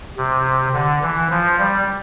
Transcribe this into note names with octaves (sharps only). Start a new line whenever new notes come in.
C3
D3
E3
F3
G3